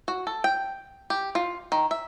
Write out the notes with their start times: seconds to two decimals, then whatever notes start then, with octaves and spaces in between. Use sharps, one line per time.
0.08 F#4
0.27 A4
0.44 G5
1.10 G4
1.35 F4
1.72 D#3
1.91 E5